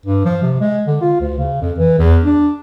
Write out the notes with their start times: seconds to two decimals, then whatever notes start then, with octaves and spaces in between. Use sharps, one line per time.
0.06 G2
0.25 F3
0.42 C3
0.60 G#3
0.87 D3
1.01 F4
1.20 D2
1.38 C#3
1.62 F2
1.78 E3
1.98 E2
2.24 D4